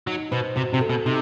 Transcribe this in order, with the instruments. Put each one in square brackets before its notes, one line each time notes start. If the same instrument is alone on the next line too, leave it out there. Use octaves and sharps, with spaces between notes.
[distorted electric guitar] F#3 [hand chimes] D#4
[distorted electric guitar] B2 [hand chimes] C5
[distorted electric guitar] C3 [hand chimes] F#4
[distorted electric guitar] C3
[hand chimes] A4
[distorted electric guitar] B2
[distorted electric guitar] C3 [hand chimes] D#4